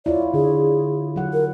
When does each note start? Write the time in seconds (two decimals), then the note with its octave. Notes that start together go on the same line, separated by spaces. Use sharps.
0.06 E4 F4 C#5 D5
0.34 D3 G#4
1.16 F#3 A4 F#5
1.33 A#4